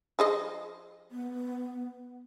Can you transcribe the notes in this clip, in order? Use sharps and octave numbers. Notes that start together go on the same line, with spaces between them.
F3 G#4 D#5
B3